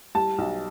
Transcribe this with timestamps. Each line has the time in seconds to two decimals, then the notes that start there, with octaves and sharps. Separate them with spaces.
0.15 G3 A5
0.38 B1